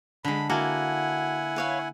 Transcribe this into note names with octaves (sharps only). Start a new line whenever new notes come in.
D3 G#3 B5
A#3 E4 F#4 F#5 G#5 A5
B4 C#5 F5